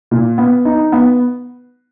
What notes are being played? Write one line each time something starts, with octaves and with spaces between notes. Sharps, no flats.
A#2
B3
D#4
B3